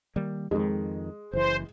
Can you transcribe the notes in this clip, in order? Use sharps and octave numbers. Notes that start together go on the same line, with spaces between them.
D#3 G3 A#3
F2 D#3 G#3
F#1 E3 C5